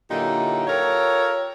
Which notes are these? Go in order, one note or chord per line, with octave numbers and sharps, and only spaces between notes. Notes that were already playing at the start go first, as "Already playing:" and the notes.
A#2 D3 F#3 D#4 E4 G4
F4 G4 A4 A#4 C#5